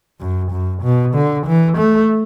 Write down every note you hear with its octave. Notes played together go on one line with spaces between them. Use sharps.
F#2
F#2
B2
D3
E3
A3